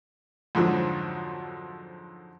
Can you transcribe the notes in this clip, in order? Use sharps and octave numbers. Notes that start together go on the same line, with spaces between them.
F2 G#2 D3 F3 F#3